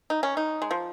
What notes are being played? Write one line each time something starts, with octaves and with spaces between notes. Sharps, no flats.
D#4
C#4
D#4
G#3
F3